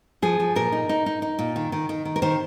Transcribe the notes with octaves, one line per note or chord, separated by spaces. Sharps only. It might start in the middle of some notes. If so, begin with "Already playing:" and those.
F3 G#4
F3
A#2 A#4
D#4
D#4
D#4
D#4
A#2
D#3
D#3
D#3
D#3
A#4
D#3 C5